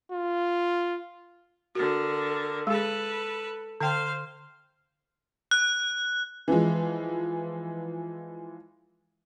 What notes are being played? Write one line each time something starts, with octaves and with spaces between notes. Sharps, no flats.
F4
D3 F#4 A#4
G#3 G#4 A4 B4
D3 C5 F5 G5
F#6
E3 F3 G#3